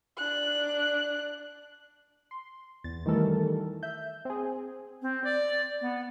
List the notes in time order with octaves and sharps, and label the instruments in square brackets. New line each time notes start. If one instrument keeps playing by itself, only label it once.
[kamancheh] D4 F#6
[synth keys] C6
E2 A6
D#3 E3 G3 A3 A4 A#4
E5 G6
C4 G#4
[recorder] C4
D5
B3